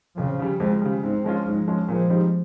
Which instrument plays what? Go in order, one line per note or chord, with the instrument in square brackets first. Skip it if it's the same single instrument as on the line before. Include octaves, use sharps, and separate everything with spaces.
[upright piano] F2 [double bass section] C#3 F3
[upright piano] C#3 G3
[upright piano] F2 [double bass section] F3 G#3
[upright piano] C#3 G3
[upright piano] G#2 [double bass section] G#3 C4
[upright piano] F3 G#3 C#4 F4
[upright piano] G#2 [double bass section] F3 G#3
[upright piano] F3 G#3 C#4 F4
[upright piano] A#2 [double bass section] F3 G#3
[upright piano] G3 C4 D#4